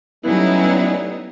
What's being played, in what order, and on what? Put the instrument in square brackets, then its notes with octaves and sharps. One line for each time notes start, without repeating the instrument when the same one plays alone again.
[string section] F#3 B3 D#4 [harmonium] G3 A3 C#4 [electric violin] E4